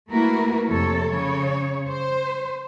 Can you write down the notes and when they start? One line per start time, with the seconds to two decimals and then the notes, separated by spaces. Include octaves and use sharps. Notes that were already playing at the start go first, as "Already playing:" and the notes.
0.10 A3 A#3 E4 F#4 A#4 B4
0.70 F2 C3 A4 C#5
1.10 C#3 C#5
1.87 C5